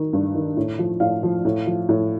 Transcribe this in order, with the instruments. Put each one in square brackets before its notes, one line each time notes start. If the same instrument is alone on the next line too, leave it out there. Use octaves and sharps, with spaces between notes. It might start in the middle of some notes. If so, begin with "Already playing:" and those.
Already playing: [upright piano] D#3
G2
D#3
A2
F3
A2 F5
F3
A2
F3
A2